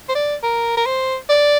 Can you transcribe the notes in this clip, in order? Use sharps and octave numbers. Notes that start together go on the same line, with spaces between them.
C5
D5
A#4
A#4
C5
D5